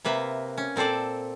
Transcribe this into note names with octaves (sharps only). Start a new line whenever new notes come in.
C3 A#3 B4 E5
C#4
A#2 C4 A4 C5 D5